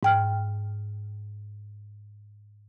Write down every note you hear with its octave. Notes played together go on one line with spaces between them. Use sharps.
G#2 G5 F6